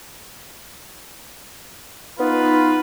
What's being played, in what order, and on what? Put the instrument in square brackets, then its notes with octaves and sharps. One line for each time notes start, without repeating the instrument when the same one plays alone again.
[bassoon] B3 [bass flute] D#4 [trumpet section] F4 B4